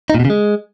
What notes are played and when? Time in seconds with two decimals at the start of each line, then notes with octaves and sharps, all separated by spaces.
0.10 D#4
0.15 A#2
0.20 B2
0.25 C#3
0.30 G#3